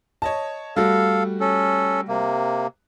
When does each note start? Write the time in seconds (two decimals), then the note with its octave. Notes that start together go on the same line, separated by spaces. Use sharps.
0.22 C#5 D#5 A5
0.76 G3 A3 F#4 A4 F5
1.40 C#4 A4
2.08 C3 A#3